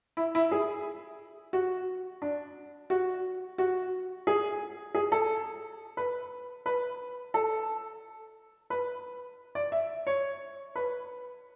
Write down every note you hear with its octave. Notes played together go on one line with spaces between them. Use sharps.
E4
E4
G#4
F#4
D4
F#4
F#4
G#4
G#4
A4
B4
B4
A4
B4
D5
E5
C#5
B4